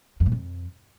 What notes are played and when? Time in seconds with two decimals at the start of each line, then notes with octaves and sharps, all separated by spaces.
0.20 F2
0.26 A#2
0.32 F2